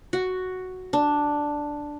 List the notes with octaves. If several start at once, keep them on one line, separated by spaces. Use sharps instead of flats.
F#4
D4